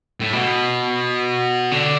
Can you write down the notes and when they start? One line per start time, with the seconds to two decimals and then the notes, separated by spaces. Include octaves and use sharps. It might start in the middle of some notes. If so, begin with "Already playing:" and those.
0.20 A2
0.33 B2
1.71 D3